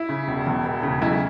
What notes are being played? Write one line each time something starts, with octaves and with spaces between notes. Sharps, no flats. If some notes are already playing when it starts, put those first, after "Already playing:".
Already playing: E4
C#3
E1
E2
E1
C#3
B1 E4